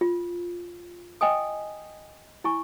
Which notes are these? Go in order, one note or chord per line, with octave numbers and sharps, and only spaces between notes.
F4
D#5 G5 G#5 D#6
E4 G#5 C#6